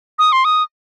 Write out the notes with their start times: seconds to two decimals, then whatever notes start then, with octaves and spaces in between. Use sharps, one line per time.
0.19 D#6
0.32 C6
0.45 D#6